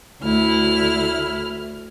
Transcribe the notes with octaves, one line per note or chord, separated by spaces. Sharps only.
D2 E4 F6